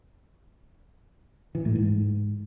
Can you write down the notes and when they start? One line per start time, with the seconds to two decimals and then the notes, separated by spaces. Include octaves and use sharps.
1.55 E3
1.65 A2
1.76 G#2